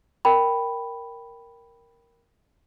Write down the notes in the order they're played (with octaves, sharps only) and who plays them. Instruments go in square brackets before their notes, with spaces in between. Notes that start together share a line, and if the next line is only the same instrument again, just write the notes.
[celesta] A#4 G5 B5